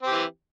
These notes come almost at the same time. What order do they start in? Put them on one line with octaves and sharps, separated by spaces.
C4 G4 E3